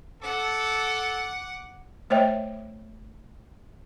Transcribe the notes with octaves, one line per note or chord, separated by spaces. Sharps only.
A4 F#5 D6
A3 C5 C#5 D#5 E5 G5